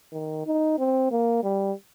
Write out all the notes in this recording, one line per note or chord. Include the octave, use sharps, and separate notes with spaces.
D#3
D#4
C4
A#3
G3